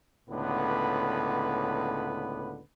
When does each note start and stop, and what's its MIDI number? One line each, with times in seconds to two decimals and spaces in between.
0.30 2.60 37
0.30 2.60 45
0.30 2.60 50
0.30 2.60 59
0.30 2.60 71